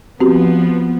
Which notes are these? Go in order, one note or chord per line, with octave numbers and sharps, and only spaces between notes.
F3 B3 C4 F#4 G4